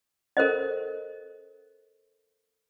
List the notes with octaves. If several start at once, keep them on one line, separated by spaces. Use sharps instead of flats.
A4 A#4 C5 D#5